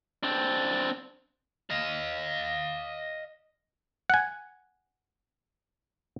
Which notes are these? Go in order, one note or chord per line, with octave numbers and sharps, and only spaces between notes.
C4 D4
D#5 F5
F#5 G#5